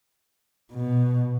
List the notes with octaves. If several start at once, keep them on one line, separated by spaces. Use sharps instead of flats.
B2